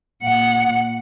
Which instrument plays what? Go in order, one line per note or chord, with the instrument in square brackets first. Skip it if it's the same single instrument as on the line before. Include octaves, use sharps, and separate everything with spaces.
[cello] A#2 F#5